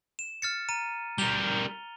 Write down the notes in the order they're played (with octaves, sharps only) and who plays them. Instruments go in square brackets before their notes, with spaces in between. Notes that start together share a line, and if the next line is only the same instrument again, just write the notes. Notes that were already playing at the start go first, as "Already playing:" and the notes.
[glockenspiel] E7
F6 A6 C#7
A#5 D#7
[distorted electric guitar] G3 A#4 [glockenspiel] F7 G7